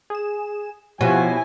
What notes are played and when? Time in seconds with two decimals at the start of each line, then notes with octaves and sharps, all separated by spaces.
0.10 G#4 E7
1.01 B2 F3 E4 F#4 G4 C#5 G#5